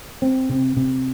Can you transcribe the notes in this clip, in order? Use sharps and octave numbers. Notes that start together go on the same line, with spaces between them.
C4
C3
C3